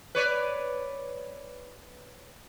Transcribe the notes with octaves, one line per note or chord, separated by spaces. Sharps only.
B4 C#5 D5